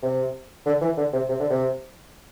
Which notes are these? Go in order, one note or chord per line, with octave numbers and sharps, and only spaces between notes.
C3
D3
E3
D3
C3
C3
D3
C3